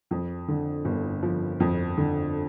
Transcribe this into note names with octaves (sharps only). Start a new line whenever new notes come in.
F2
D3
G1
F3
F2
D3